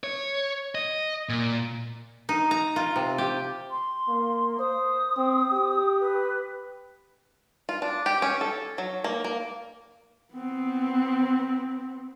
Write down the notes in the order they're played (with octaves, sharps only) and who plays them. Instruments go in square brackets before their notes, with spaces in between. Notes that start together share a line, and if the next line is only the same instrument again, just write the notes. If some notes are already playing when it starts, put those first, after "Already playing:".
[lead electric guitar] C#5
D#5
A#2
[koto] D#4
A#5
F4
C3
G4
[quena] C6
[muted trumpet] A#3
[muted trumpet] C5 [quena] D#6
[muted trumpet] C4
G4
[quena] B4
[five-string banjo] F4
D4
G4
C#4
A4
F#3
A#3
A#3
[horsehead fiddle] B3 C4